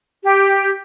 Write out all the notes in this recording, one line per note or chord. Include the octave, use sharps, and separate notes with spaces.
G4